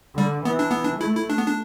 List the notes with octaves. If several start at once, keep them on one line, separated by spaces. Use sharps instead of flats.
D3 G3
E3 B3
D4
B3
D4
A3 E4
E4
D4
B3
D4